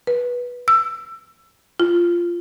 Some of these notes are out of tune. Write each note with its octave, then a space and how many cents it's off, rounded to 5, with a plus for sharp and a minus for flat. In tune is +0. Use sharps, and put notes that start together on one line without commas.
B4 -15
E6 +20
F4 -10